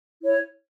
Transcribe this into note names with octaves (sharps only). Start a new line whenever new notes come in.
E4 C#5